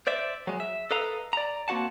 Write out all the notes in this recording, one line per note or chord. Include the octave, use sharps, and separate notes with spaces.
C5 D5 E5
F#3 G#3
E5
A4 B4 D#5 F5 A#5
D5 A#5
A#3 C4 F#4 F#5 A5